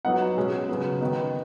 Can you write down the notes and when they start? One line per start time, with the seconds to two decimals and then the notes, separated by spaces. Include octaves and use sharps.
0.05 F#3 B3 D#4 F#5
0.37 B2 G#3 C#4
0.69 C#3 F#3 B3
1.01 D#3 B3 D#4